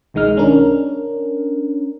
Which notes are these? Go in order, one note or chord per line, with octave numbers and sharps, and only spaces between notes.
B1 D#3 G#3 D#4 F6
C#4 D4 A#4